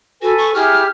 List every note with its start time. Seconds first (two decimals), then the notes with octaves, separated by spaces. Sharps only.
0.22 F#4 A4 B4 G#5
0.38 C#6
0.55 E4 G4 G#4 F6